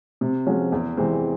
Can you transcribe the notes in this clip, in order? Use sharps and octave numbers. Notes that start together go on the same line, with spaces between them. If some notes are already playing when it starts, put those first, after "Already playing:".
C3
F3 G#3 C#4 F#4
E2
C3 E3 G#3 C4